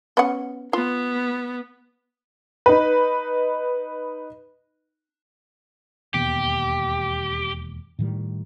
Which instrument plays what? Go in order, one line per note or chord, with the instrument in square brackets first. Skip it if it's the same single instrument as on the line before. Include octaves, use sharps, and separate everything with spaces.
[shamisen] B3 C#4 F#5
[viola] B3 [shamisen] F4
[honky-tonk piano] D#4 B4
[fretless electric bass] E1 D#2 B3 [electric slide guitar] G4
[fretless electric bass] A2 D#3 G3